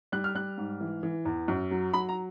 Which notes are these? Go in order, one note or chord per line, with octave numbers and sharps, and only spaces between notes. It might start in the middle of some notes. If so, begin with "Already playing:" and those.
G3 F#6
F6
G3 F#6
G#2
E3
E3
E2
F#2
F#3
F#3 B5
A#5